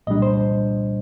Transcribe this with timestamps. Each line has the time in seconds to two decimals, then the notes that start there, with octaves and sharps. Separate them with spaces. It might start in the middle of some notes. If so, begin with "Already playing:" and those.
0.07 C2 A#2 G3 D4 D#5
0.22 C5